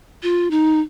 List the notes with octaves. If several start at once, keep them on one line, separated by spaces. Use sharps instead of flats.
F4
D#4